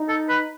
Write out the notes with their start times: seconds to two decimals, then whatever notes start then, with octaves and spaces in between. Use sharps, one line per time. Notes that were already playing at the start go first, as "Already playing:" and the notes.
Already playing: D#4
0.08 A4
0.29 B4